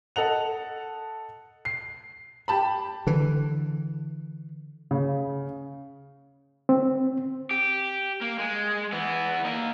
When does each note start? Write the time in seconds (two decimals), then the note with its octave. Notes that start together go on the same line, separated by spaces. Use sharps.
0.16 A4 D#5 F#5 F7
1.65 C7
2.48 G4 A5 B5
3.07 D3 E3
4.91 C#3
6.69 C4
7.51 G4
8.21 A#3
8.39 G#3
8.92 E3 B3
9.45 A#3 D#5